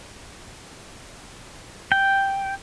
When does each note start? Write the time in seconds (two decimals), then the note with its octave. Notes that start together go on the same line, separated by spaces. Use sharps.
1.92 G5